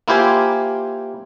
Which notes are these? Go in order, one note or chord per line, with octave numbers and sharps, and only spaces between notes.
A#3 E4 F4 G4 C5 G#5